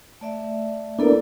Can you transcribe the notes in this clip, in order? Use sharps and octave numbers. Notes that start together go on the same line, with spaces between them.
A3 D5 E5
A#3 B3 D4 E4 A4 D5